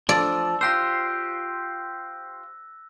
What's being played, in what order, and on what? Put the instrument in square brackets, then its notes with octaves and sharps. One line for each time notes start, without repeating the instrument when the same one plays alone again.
[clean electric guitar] F3 [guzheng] D5 [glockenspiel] E6
[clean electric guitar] F4 G4 C5 [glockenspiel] E6 F#6 A#6